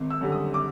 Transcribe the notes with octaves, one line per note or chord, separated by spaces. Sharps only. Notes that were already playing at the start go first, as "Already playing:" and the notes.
Already playing: G#1
E6
F#2 D3 G3
D#6
D6